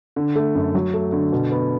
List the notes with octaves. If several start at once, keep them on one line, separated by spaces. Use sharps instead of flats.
D3
A3
F#2
F#3
A3
D3
B2
B3